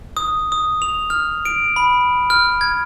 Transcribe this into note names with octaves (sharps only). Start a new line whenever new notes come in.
D#6
D#6
F7
F6
D7
B5
F6
G#6